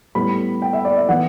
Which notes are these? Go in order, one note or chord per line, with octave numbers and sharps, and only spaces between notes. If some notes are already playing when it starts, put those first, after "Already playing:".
A2 G3 B3 B5
G5
E5
D5
E5
E3 B3 F#5